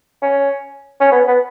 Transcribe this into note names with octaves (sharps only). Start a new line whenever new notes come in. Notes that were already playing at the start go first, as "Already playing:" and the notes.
C#4
C#4
B3
B3